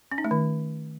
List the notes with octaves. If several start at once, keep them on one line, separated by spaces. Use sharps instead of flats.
C#4
D#4
A3
D#3